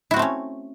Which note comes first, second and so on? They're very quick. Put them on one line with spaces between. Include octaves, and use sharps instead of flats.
E4 F#4 C4 A3 C#4